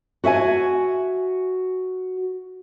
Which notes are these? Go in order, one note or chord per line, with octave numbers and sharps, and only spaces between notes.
F#4 E5 G5 G#5